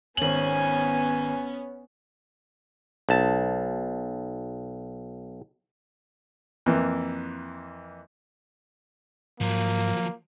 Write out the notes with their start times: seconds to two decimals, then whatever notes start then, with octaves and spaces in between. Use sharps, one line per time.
0.17 G#1 B3 C#4 G#5 F#7
3.09 B1 A5
6.66 F2 E3 A#3
9.41 G#2 F3 F#3 A#3